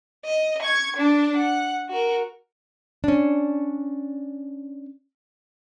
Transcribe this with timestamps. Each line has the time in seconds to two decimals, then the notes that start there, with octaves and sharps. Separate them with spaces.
0.25 D#5
0.62 C#6 G#6
0.97 D4 A5
1.37 F#5
1.89 F#4 A#4
3.04 C#4 D4